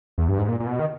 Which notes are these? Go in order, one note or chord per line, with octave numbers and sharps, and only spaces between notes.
E2
G2
G#2
A#2
A#2
B2
D#3